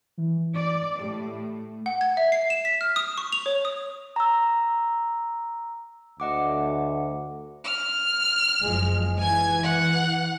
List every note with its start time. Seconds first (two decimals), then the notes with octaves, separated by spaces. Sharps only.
0.18 E3
0.53 D5
0.99 A2 G4
1.86 F#5
2.01 G#6
2.17 E5
2.32 C7
2.50 E7
2.65 B6
2.81 F6
2.96 D#6
3.18 C#6
3.32 F7
3.46 C#5
3.65 D#6
4.16 A#5 E6
6.20 D2 D#5 F#5 D6
7.64 F6
8.63 F#1 F3 G#3
9.18 E3 G#5 G#6
9.64 F#5